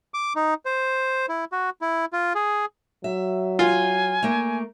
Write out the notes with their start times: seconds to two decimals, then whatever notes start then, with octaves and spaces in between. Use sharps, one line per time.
0.14 D6
0.36 D#4
0.65 C5
1.29 E4
1.52 F#4
1.81 E4
2.13 F4
2.35 G#4
3.04 F#3 E5
3.59 F4 G#5
4.23 A3 A#3